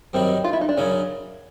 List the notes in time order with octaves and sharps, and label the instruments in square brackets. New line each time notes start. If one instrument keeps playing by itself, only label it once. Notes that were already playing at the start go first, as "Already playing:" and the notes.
[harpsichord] F#2 D#3 G3 [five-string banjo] C4
[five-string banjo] F4
E4
D#4
D4
[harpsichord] F#2 C#3 F#3 [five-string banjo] C#4